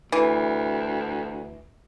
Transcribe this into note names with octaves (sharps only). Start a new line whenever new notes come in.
D2 E3